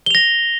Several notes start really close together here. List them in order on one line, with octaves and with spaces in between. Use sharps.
G7 F7 A#6